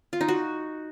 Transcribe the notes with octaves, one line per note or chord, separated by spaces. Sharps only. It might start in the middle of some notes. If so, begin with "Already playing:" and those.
F4
D#4
F#4